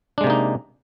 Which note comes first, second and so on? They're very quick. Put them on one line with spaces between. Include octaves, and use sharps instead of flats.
D4 G#3 C3 A#3 D#4